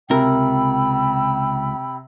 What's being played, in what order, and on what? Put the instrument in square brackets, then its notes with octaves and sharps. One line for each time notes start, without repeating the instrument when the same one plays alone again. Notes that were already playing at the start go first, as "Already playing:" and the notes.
[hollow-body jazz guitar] C#2 A#4 [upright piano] C3 [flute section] G5 B5 E6